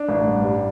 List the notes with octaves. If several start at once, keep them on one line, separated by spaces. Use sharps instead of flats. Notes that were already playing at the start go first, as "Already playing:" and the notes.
Already playing: D4
A1
G2
G3